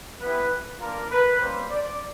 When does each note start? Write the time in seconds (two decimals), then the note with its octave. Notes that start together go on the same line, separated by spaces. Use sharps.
0.21 B3 E4 G4 B4
0.80 A#3 D4 F4 A#4
1.11 B4
1.40 G3 A#3 C#4 C5
1.70 D5